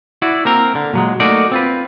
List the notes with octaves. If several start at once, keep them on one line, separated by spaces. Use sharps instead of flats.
E4 F#4 D5
A#3 C4 A#4
D3
A#2 F#3 G#3
A3 A#3 D#4 F#4 D5
C4 F4 B4